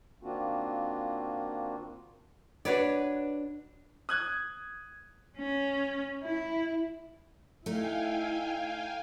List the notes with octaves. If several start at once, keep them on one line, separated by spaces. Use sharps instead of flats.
D#3 A#3 C4 D4 F4 F#4
D4 F#4 B4 C#5 D5
D#6 F#6 G#6
C#4
E4
A3 D#4 E4 F5 G5 G#5